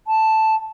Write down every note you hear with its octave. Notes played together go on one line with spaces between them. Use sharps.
A5